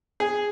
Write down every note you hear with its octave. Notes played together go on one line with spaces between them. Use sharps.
G#4